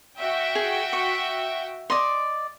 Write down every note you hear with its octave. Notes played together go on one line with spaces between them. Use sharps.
F#4 E5 G5
G#4
C#6
D5 D#5 C6